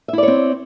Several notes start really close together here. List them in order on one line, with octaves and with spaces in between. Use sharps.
E5 E4 D5 C#5 C4